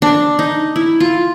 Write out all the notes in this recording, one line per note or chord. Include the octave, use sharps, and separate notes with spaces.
D4
D#4
E4
F4